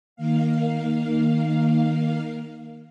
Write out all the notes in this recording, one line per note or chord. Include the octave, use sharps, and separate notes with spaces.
D#3 A#3 F5